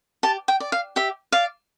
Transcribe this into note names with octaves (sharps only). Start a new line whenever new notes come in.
G4 A5
G5
D5
F5
G4 E5
D5 F5